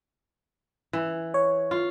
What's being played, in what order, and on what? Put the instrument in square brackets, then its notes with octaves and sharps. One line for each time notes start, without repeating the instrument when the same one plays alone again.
[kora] E3
[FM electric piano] C#5
[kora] F4